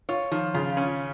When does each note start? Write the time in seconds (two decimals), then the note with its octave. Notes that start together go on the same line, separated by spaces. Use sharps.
0.09 F4 C#5
0.32 D#3 F3
0.54 C#3 F4
0.77 C#4